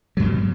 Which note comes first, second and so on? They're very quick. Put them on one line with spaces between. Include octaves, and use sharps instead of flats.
F#3 G2 G3 B2